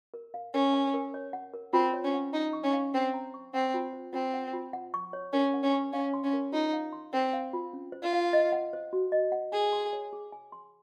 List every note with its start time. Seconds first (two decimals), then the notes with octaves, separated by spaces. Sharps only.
0.14 A#4
0.34 F5
0.53 C#4 A#4
0.73 G#5
0.94 A#4
1.14 C#5
1.33 F#5
1.54 A#4
1.73 C4 F4
1.94 C#5
2.04 C#4
2.14 F#5
2.33 D#4 A#5
2.53 C#6
2.63 C#4
2.73 F5
2.94 C4 C5
3.14 A#5
3.34 C#6
3.54 C4 F#5
3.74 F4
3.93 C5
4.13 C4 F4
4.34 F#5
4.53 F4
4.73 F#5
4.94 C#6
5.13 C#5
5.33 C#4 A#4
5.54 F#5
5.63 C#4
5.73 C#6
5.92 C#4 F5
6.14 C6
6.24 C#4
6.33 A#4
6.52 D#4 F4
6.73 F5
6.93 C6
7.13 C4 C5
7.33 F5
7.53 F4
7.73 C#4
7.92 C5
8.03 F4
8.13 F5
8.33 D#5
8.52 F#5
8.73 C5
8.93 F#4
9.12 D#5
9.32 F#5
9.52 G#4 G#5
9.73 C6
9.93 C#5
10.13 G#4
10.32 G#5
10.52 C6